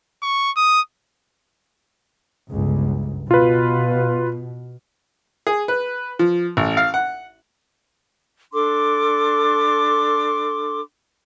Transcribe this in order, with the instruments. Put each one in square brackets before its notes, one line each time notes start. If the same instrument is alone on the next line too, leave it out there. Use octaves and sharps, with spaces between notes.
[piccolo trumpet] C#6
D#6
[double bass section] G1 C#2
[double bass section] B2 [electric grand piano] F4 B4
[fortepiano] G#4
B4
F3
A1
F5
F#5
[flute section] D4 A4 C6 D6